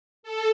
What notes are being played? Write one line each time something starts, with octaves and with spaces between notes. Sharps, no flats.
A4